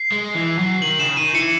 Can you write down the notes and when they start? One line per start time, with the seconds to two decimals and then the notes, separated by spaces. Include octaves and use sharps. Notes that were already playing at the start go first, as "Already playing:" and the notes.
Already playing: C7
0.12 G#3
0.35 E3
0.59 F#3
0.82 D#3 F#7
0.99 C#3 E7
1.17 D#3 D#7
1.35 E3 C#7